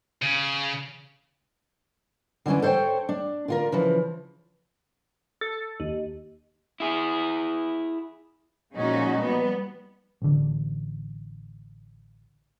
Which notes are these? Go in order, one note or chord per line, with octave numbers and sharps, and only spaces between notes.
C#3
D3 E3 A#3 C#4 D4
A4 C5 C#5 F#5 G5
D4
D3 F4 A#4
C#3 E3 F3
A4
D#2
E4 G#4
A#2 F3 G#3 C#4 D#4 F#4
G3 B3
A1 D3